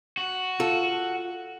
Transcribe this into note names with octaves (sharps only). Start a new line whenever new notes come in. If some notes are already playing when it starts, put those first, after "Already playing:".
F#4
F4 A4